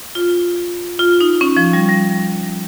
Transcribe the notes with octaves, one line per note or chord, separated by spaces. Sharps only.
F4
F4
D#4
C#4
F3
G3
G3